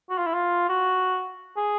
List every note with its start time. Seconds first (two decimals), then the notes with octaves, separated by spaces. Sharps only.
0.10 F#4
0.17 F4
0.27 E4
0.33 F4
0.69 F#4
1.57 G#4